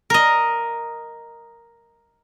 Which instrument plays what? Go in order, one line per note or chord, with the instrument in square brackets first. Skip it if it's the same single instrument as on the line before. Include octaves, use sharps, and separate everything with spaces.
[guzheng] A#4 D#5